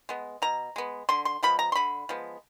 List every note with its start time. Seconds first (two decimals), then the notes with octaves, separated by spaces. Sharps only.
0.09 G#3 B3
0.42 B2 A#5
0.76 G#3 B3
1.09 D3 C6
1.25 C6
1.43 F3 G#3 B3 B5
1.59 A#5
1.72 C6
1.75 D3 B5
2.09 F3 G#3 B3